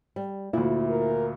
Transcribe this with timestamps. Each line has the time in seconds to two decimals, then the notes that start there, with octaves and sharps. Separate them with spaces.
0.16 G3
0.53 D2 A#2 E4
0.89 A#4